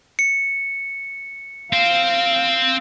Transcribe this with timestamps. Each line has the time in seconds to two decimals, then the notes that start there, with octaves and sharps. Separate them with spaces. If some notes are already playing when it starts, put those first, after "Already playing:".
0.19 C#7
1.73 C4 C5 F5